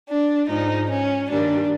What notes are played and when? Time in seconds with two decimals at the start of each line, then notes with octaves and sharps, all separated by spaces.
0.09 D4
0.48 G#2 F3 G#3 D#4
0.90 C#4
1.29 G2 D#3 G3 A#3 D4